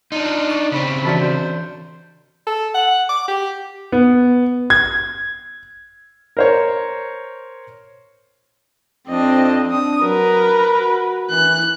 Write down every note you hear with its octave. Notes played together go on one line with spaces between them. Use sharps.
D4 D#4 F4
D5 C#6
C#3 C4 B5
E3 F#4 D5 A5
C5
A4
F#5
D6
G4
B3
G#6
A#4 C5 C#5
F2 C4 D4 D#5
D4 D#6
F#3 A#4 B4
F#4
E3 F#6